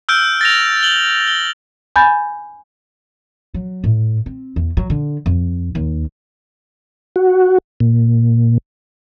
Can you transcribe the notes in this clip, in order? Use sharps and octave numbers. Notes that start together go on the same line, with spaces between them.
E6 F6 G6 D7
A6 A#6 F7
F#7 G7
G7
G#5 B5 G6 A6
F#3
A2
C4
E2
F#3
D3
F2
D#2
F#4
A#2